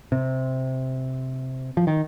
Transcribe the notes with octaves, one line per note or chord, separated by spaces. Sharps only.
C3
F3
D#3